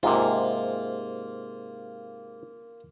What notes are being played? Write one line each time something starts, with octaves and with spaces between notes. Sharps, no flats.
G#2 C3 A#3 F4